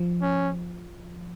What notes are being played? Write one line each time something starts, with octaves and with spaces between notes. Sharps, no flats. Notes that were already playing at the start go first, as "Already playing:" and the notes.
Already playing: F3
C#4